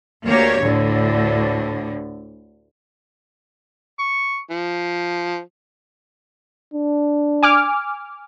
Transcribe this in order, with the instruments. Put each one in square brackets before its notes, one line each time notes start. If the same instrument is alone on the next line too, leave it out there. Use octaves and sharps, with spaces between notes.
[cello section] D2 A#3 G4 C#5
D2 A2 D3
[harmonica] C#6
F3
[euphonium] D4
[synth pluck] G#5 D6 F6